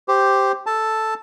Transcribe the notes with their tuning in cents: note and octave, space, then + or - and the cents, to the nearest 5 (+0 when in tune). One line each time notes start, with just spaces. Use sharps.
G4 +0 C5 +0
A4 +0 A5 +0